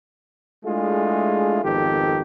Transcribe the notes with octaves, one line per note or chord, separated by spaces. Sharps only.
G#3 A3 D4 E4 F4 G#4
G#1 F2 D#3 B3 G4 A4